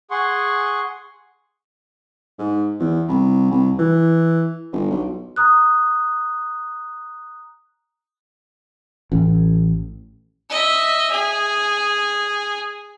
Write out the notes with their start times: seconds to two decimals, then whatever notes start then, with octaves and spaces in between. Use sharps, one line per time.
0.11 G#4 F#5 C6 C#6
2.39 G#2
2.80 E2
3.09 C2
3.52 C2
3.79 E3
4.73 G1
4.91 B1
5.36 A#5 D#6 F#6
9.12 A1
10.50 D#5 E5
11.11 G#4